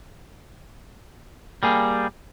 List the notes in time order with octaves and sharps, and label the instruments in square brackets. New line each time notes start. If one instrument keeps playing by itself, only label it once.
[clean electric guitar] G3 A#3 G#4